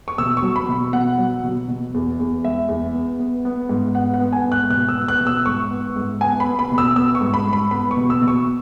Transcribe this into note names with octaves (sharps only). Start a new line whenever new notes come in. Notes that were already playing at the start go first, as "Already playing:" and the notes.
C#6
B2 E6
C#6
F#3
B5
B2
B2 F#5
F#3
B2
B2
E2
E2
G#3 E5
E2
B3
B3
B3
G#2
B3 F#5
F#5
B3
G#5
G#2
F#6
B2 F#6
E6
B3
F#6
B2
E6
G#2 C#6
B3
G#2
B3 G#5
B5
B3
B5
B2
E6
B3 E6
C#6
G#2
B5
G#2
B5
B3 B5
C#6
B2
E6
B2
C#6